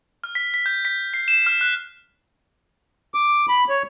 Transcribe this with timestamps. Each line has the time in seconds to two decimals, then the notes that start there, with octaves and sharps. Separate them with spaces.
0.24 F6
0.35 B6
0.54 B6
0.66 G6
0.85 B6
1.14 C7
1.28 E7
1.46 F6
1.61 F#6
3.14 D6
3.49 B5
3.70 C#5